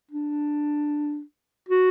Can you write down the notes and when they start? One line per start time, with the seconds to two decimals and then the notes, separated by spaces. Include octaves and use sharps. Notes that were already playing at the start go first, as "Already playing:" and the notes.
0.11 D4
1.69 F#4